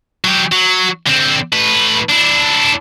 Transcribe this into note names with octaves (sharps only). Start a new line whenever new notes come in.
F#3 G4
F#3
D3 C4
A2 B4
D4 E4